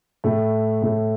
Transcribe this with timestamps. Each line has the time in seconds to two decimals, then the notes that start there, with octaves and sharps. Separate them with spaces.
0.24 A2 A3
0.82 A2 A3